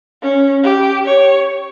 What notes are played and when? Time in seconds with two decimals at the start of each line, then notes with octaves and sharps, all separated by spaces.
0.22 C#4
0.64 G4
1.05 C#5